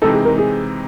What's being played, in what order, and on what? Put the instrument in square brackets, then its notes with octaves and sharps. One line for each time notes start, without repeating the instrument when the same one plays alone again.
[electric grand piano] C3 E3 G#3 C4 D#4 [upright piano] A4
[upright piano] G#4
A#4
G#4